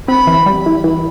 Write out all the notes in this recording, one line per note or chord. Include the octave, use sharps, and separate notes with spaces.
C4 B5
E3
G3
E3
E3